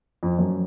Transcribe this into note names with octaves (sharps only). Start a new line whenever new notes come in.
F2
F#2